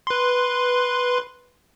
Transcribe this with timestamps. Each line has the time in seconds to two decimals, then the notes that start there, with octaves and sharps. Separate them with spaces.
0.07 B4 C6